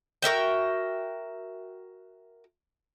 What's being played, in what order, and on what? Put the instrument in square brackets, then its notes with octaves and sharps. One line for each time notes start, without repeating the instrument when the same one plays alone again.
[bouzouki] F#4 A#4 E5 G5